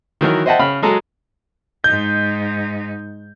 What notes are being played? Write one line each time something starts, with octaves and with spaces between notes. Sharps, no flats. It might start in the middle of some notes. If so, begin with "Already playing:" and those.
D#3 E3 F#3 A#4
C5 D#5 E5 F#5 G5 A5
C#3 B5 F6
F#3 G#3 G#4 A4 A#5
G#2 D#4 G6